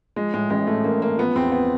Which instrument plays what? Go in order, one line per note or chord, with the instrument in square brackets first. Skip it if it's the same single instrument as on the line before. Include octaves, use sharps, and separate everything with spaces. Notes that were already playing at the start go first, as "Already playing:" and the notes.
[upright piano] F3 G#3
A2 G#3
A1 G#3
A2 A3
A1 A#3
A1 A#3
F3 B3
E2 C4
B3